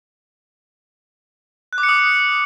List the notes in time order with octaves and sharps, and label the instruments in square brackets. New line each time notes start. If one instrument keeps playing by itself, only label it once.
[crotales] F#6
D6
C#7
D#6